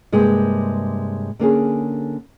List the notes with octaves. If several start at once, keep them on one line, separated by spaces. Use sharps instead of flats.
G2 C3 G#3 A#3
D3 A#3 C#4 G#4